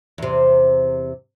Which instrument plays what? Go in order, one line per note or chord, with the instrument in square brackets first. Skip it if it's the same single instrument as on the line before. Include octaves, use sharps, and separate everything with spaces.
[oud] E2 C3